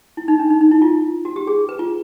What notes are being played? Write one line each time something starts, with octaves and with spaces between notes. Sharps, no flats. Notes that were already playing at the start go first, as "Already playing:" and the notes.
E4
D#4
D4
D#4
D#4
E4
F4
F#4
G4
G#4
B4
F4